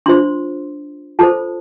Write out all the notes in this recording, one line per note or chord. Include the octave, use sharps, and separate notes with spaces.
D4 F4 C5 C6
F4 A4 C5 A5